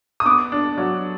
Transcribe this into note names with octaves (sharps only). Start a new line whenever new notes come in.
D#6
B3 D6
D4
F#3